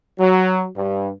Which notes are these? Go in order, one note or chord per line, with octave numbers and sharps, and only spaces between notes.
F#3
G2